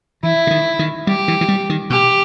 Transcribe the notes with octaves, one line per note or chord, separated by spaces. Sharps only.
E3 E4
C#3
D#3
D#3
G3 G4
E3
E3
G3
D#3
B2 G4